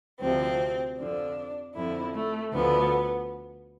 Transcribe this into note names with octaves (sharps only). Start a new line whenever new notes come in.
D2 C3 F3 C4
F2 D3 F3 D4
F2 D3 F3 E4
A3
D2 D3 F3 B3